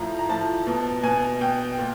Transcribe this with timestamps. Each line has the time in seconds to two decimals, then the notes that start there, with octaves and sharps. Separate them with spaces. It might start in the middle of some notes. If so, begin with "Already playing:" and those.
Already playing: A2 F3 A#5
0.19 A#5
0.29 A2 F3 A5
0.67 B2
1.03 B2 G#5
1.41 B2 G5
1.78 A#2